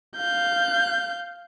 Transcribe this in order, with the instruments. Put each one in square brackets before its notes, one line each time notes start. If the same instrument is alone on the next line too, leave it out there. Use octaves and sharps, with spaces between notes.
[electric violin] F5 G6